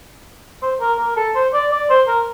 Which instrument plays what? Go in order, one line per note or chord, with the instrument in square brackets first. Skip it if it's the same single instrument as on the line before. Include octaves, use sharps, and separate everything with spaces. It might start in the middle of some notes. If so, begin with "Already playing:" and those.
[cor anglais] C5
A#4
A#4
A4
C5
D5
D5
C5
A#4